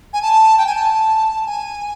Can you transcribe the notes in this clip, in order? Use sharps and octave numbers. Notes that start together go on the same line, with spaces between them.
G#5
A5
G5
G#5
A5
G#5